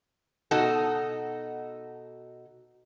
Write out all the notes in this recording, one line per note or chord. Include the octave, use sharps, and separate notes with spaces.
B2 D#4 F#4 A4